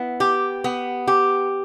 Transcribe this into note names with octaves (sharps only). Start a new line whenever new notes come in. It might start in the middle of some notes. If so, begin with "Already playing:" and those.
Already playing: B3 E4
G4
B3
G4